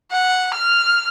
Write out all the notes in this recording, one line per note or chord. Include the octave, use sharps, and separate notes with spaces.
F#5
F6